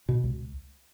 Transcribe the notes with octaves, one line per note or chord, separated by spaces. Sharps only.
B2
C#2